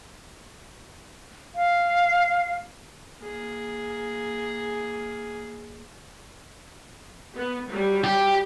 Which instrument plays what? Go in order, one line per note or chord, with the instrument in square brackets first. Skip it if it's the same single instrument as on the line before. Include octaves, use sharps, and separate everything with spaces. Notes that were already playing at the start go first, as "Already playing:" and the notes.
[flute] F5
[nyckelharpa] A#3 G#4
[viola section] B3
F#3 G3
[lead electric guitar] G4